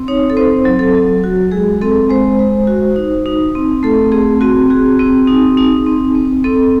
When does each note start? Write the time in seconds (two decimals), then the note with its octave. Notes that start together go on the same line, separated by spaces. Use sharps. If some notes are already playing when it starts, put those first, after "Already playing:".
Already playing: C4
0.08 D#4 C#5
0.30 A4
0.37 C4 C5
0.65 F#3
0.79 A4
0.95 F#3
1.24 F#4
1.51 G#3 G#4
1.81 C4 A4
2.10 G#3 C5
2.39 G#3
2.67 F#4
2.96 D#4
3.26 D#4
3.55 C4
3.83 A3 A4
4.12 C4 G#4
4.41 C4 F#4
4.70 F#4 G#4
4.99 C4
5.27 D#4
5.57 D#4
5.86 C4
6.15 C4
6.44 C4 A4